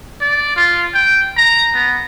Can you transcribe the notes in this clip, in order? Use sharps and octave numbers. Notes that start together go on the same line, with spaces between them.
D5
F4
G5
A#5
B3